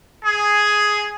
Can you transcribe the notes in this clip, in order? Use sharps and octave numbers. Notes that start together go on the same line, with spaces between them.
G#4